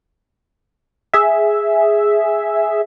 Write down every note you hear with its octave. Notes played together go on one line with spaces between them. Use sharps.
G#4 E5